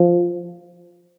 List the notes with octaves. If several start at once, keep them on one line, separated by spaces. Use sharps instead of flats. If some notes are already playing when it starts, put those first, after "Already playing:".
Already playing: F3